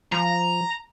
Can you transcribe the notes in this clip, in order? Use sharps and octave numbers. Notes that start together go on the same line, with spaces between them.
F3 A#5